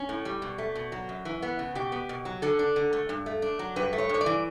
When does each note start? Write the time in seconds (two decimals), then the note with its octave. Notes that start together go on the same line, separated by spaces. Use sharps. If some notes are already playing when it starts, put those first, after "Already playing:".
Already playing: C#4
0.09 A2
0.25 G3
0.42 B2
0.58 A3
0.75 B2
0.92 F#3
1.09 F#2
1.25 E3
1.42 B3
1.59 C#3
1.75 B2 G4
1.92 B3
2.09 B2
2.25 F#3
2.42 D3 A4
2.59 D4
2.76 D3
2.93 A3
3.09 G2
3.26 A3
3.42 D4
3.59 F#3
3.76 G2 B4
3.93 A3
3.98 C#5
4.09 G2 C#5
4.21 D5
4.26 E3